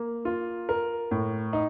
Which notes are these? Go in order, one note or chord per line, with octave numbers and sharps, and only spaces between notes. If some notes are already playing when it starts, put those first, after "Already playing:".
Already playing: A#3
F4
A#4
A2
D#4